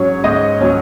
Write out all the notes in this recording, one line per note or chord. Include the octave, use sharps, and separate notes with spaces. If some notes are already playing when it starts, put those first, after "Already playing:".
Already playing: G#2 F#3 C#4 C#5
G#2 D#5
F#3 C#4